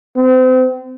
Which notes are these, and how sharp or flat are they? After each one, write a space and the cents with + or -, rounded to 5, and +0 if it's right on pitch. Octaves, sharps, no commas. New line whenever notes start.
C4 -35